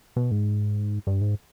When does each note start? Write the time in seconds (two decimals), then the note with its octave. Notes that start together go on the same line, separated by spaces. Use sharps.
0.16 B2
0.31 G#2
1.07 G2
1.21 G#2